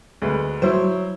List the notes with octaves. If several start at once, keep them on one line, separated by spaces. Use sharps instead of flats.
D2 G#3 B4
F#3 E4 C5